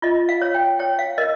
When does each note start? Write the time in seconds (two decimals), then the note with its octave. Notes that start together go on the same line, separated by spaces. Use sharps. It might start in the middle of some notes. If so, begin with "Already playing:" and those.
0.02 F4 D#5
0.29 F5
0.42 C#5
0.54 G5
0.79 C#5 G5
0.99 F5
1.18 A#4 D#5